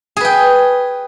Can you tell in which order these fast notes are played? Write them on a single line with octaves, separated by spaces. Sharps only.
G#4 B4 G5